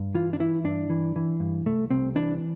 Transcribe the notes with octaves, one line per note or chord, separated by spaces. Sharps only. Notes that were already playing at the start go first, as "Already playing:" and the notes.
Already playing: G2
E3 F4
D4
E3 E4
G2 D4
E3
E3
G2
C2 A3
C2 C4
E3 D4